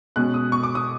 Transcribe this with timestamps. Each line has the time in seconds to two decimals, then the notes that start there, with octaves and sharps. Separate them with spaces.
0.16 B2 G#3 C#4 F#6
0.34 D#6
0.52 C#6
0.63 D6
0.75 D#6